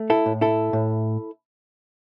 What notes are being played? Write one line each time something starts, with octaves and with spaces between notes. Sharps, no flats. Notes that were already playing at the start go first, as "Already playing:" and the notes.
Already playing: A3
E4 A4
A2
E4 A4
A2